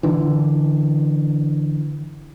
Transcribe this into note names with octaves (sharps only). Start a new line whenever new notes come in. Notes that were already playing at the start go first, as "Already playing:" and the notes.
D3 E3